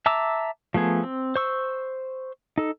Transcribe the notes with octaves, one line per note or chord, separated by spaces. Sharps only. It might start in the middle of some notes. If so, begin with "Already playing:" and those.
E5 A5 A#5 D6 E6
F3 A3 B3 G#4
C4
C5 C#6 E6
D#4 A4